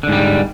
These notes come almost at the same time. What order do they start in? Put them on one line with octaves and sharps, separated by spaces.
D3 G#2 G3